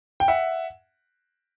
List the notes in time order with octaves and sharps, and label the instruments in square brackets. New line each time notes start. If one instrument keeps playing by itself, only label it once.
[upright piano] G5
E5 F#5